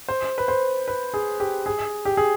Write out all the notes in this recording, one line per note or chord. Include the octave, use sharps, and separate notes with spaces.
C5
B4
C5
B4
G#4
G4
G#4
G4
G#4